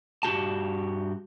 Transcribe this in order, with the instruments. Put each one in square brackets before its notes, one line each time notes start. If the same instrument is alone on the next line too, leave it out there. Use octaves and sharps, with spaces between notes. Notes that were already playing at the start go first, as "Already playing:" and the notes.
[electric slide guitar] G2 F#4 G4 A5